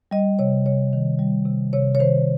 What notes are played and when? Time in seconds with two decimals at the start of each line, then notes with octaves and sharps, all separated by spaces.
0.11 G3 D#5
0.39 C3 C#5
0.66 C3 C#5
0.93 D#3
1.19 G3
1.46 C3
1.73 C3 C#5
1.95 C#5
2.00 D#3 C5